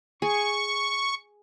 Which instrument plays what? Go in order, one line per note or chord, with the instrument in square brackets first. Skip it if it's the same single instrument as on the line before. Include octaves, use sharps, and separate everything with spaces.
[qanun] G#4 [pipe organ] C#6